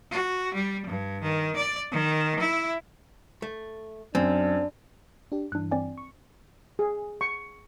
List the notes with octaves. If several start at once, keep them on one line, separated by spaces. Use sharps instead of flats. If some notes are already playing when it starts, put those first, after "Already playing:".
F#4
G3
G2
D#3
D5
D#3
E4
A3
F#2 C4 D4
D4 G4
G2 E3 D4 F#6
C4 D5 G#5
C#6
G#4
C#6